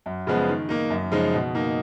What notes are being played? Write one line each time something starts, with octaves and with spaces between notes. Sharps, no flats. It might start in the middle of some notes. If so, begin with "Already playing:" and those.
F#2
C#3 F3 G#3 B3
D#3
A#3 D#4
F#2
C#3 F3 G#3 D#4
B2
A#3 D#4